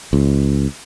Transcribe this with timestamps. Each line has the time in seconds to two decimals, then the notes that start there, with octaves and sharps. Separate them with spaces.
0.13 C#2